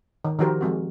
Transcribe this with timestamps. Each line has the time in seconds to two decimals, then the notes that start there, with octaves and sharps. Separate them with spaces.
0.25 D#3
0.39 D#3 F3 F#4 G4 A#4 C5
0.61 F3 G#3 C4 F#4